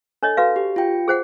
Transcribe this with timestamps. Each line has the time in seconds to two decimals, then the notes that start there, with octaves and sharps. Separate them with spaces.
0.23 D4 A4 C#5 D#5
0.37 F#4 B4 F5
0.56 G4
0.76 F4 G5
1.08 G#4 C5 F#5